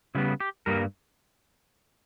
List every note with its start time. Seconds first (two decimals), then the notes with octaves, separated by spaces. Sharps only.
0.15 C#3 G3 B3 E4
0.40 G4
0.66 G2 G3 A#3 A#4